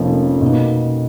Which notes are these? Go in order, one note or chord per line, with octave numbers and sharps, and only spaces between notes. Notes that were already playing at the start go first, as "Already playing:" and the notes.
Already playing: F1 F2 F3 A#3 C#4
B2 A#3 D#4